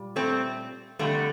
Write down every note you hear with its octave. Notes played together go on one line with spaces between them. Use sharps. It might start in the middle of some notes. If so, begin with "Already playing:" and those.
Already playing: A#2 G3
A3 C4
F2 D3 G3 A3